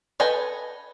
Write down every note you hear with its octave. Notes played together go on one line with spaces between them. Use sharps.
A4 B4 D#5 G5 G#5